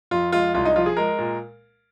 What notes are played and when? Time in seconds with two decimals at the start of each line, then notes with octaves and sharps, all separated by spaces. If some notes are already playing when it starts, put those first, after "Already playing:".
0.11 F2 F4
0.32 G#3 F4
0.54 C2 F4
0.65 D#4
0.76 F3 F4
0.86 G#4
0.97 G#3 A#4
1.19 A#2